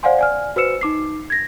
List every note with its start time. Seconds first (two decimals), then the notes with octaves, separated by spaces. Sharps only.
0.03 C5 D5 F5 F#5 G#5 C6
0.19 D5 G#5 F6
0.56 F#4 B4 C5 E6 C#7 E7
0.81 D#4 D6 C7
1.30 G#6 A#6